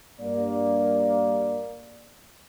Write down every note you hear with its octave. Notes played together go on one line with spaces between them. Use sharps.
G2 A#3 D5